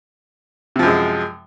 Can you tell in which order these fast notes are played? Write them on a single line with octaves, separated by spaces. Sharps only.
C3 F3 F#2 G#3